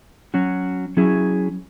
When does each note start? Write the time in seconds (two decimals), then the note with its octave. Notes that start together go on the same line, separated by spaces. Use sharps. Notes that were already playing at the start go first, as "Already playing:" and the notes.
0.34 F#3 C#4 F#4
0.97 F#3 C#4 E4 G#4